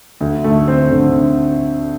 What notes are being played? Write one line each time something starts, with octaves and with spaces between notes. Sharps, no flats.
D2
A3
C4
D3